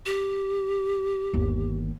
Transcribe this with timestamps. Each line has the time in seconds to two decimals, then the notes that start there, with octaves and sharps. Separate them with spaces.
0.06 G4
1.34 G1 D#2